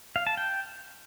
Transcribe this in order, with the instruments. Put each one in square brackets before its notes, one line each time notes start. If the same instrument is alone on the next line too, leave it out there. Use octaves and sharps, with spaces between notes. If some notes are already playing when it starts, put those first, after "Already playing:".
[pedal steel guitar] F5
A5
G5